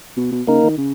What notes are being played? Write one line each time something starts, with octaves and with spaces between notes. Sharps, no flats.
B2
B2
C#3 A#3 D#4 A#4
D#3
C#3